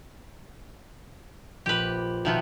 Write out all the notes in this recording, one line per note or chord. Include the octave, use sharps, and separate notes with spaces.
A#1 G4 B4 B5
B2 D#3 F3 B3 E5 G5